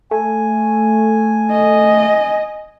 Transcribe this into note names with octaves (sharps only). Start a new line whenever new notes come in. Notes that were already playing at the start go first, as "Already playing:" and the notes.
A3 G#5
D#5